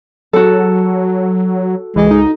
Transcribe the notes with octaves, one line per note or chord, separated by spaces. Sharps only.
F#3 F#4 A4
C#2 E3 G#3
D#4